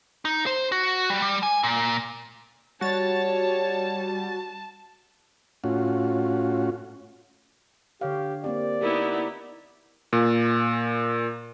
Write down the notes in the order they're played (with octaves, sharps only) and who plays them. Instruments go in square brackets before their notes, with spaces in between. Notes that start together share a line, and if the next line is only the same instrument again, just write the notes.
[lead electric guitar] D#4
C5
F#4
G3
G3
G#5
A#2
[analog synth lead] G3 [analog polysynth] F#4 A6 [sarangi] C#5 [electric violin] A5
[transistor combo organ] A2 C#4 F4 F#4
[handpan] D3 C#5 F5 [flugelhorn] G4
[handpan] A#3 C4 G4 [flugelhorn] D5
[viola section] B3 D#4 E4 [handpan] G4 A#4
[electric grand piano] A#2